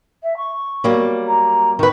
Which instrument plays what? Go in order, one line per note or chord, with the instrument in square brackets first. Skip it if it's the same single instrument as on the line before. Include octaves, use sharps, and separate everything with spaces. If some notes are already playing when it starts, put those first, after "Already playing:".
[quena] E5
C#6
[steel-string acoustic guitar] F#3 G3 A#3
[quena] A#5
[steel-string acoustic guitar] D#3 B4 [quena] C#6